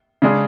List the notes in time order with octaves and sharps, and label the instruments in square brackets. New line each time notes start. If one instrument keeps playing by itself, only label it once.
[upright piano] C#3 G#3 D4 G#4